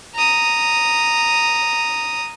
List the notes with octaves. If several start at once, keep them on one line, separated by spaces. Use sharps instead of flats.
A#5 D#6